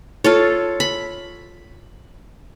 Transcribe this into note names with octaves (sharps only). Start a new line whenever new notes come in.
F4 A4 C#5
B5